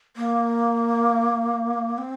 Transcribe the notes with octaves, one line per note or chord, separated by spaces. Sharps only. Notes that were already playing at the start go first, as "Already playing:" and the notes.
A#3
C4